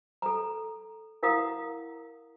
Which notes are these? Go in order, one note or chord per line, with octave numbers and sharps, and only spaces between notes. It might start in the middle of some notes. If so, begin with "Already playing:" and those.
A4 A#5
E4 A#4 F5 F#5 A#5 D#6